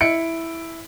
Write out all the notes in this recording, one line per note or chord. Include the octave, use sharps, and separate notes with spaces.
E4 C#7 D7